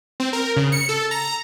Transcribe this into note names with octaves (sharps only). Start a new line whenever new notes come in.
C4
A#4
C#3
C#7
A4
A#5